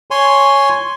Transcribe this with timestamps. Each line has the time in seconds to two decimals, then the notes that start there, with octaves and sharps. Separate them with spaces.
0.11 C#5 G#5 C6